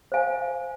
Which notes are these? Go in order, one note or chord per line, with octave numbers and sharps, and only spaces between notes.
C5 F5 G#5